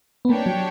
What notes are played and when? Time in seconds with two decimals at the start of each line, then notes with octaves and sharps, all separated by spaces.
0.25 B3
0.29 A#3 D4 G4 C#5 G5
0.46 F#3